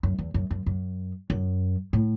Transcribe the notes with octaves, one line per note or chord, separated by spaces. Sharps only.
F#2
E2
F#2
F#2
F#2
F#2
A2